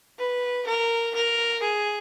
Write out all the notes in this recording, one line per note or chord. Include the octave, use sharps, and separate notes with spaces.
B4
A#4
A#4
G#4